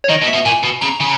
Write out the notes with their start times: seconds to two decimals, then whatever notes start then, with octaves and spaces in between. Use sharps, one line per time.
0.04 C#5
0.09 D#3 D#5
0.22 B2
0.27 E5
0.33 B2
0.45 A#2 G#5
0.63 B2
0.81 C#3 A#5
1.00 C#3